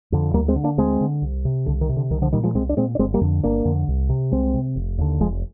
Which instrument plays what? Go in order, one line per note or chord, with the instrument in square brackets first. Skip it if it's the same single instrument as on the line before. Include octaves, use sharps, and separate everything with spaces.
[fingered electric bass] F2 D3
D2 G3 A#3
G#3 C4
D3
A#3 D4
D2 G#3 C4
D3
C2
C3
C2 D3
D#3
C3
D3
C2 D#3
D3 F3
A#2 D#3 G3
F3 G#3
C2 G#3 C4
D4
A#2 G#3 C4
D4
G1 G#3 C4
G3 A#3
F2 D3
G1 A#3 D4
F2 D3
C2
C3
C2 G#3 C4
C3
F1
D#2 D3
F1 F3 G#3